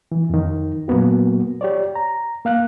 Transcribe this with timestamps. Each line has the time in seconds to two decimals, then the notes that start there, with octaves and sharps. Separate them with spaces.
0.12 E3
0.30 F2 D#3
0.88 A#2 F#3 A#3 B3 F#4
1.61 G4 C#5 D5
1.95 A#5
2.45 A#3 F5 F#6